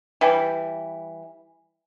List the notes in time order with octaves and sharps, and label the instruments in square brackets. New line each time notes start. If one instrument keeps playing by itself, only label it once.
[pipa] E3 G3